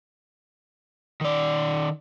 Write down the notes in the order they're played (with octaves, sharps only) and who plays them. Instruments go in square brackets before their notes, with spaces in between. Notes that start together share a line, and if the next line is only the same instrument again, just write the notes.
[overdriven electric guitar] D#3 D5